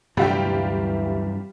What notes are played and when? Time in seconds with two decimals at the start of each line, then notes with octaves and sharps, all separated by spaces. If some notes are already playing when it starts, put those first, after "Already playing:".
0.17 D2 G2 C3 E3 F#3 G3 F4 G5